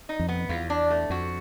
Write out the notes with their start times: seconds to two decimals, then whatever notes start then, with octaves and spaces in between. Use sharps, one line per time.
0.09 D#4
0.19 F2
0.28 B3
0.49 E2 F4
0.70 D4
0.90 A3
1.10 F2 F#4